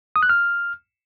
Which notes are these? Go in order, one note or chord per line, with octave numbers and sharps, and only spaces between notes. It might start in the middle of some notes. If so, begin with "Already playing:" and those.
D#6
F#6
F6